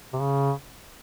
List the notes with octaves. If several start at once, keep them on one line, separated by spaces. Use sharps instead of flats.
C3
C#3